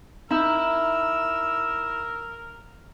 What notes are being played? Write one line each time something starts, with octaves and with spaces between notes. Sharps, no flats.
D#4 E4 A#4 E5 E6